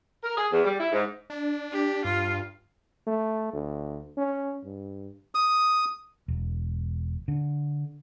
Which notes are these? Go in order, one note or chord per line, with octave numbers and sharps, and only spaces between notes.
A#4
G#4
E2
G3
E4
G#2
D4
G4
G2 F4
A3
D2
C#4
G2
D#6
E1
D3